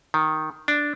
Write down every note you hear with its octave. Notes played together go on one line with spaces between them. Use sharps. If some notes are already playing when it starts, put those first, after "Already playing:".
D#3
D4